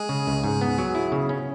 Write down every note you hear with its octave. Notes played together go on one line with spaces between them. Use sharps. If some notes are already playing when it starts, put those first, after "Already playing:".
Already playing: G#3 G#4
C#3
C#2
G#2
B3
F#3
E4
C#3
C#4